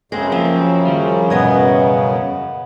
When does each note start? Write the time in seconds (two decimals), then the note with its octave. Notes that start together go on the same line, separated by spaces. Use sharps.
0.12 F#2 C#3 G#3 C4
0.32 F3 A#3 C4
0.85 D#3 F3 G3
1.30 E2 G2 B2 B3 D#5 G#5